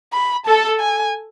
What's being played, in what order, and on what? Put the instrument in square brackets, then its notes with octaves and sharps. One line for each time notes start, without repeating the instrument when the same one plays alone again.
[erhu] B5
[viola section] A4 [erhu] A5
[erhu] G#5